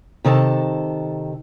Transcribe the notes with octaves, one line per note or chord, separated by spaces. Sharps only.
C3 D#3 A4 A5